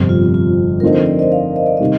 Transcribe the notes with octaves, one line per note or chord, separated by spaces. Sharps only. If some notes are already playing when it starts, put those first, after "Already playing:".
Already playing: G1 F2 C3 G3
F4
F4
D3 F3 A3 C4 D#4 A#4
C5
D5
D#5
F5
D#5
D5
C3 D#3 G3 D#5